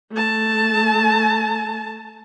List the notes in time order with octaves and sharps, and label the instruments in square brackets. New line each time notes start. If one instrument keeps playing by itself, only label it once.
[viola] A3 A5